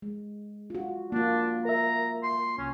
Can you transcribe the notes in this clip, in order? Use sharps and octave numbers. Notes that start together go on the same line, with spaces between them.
G#3
F4 F#4
A#3 D4 F4
A#4 E5 A#5
C6
C2 C#4